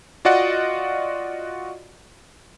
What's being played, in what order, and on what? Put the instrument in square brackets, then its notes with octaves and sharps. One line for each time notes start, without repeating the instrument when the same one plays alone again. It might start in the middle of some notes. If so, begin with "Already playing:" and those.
[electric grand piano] F4 F#4 D5 D#5 F#5